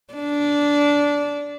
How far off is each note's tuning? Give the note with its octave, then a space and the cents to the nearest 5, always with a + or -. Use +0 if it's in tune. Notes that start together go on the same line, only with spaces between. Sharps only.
D4 -15